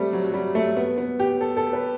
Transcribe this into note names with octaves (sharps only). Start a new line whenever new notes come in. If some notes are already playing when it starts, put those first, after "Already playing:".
Already playing: G3 A3 C4
F#3
F#3
G3
A3
B3
B3
G4
A4
A4
B4